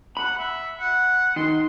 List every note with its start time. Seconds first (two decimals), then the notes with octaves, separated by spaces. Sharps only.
0.17 F#5 B5
0.39 E5
0.80 F#5
1.36 D#3 C6